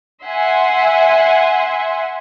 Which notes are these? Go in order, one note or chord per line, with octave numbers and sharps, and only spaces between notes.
E5 F#5 G#5 C6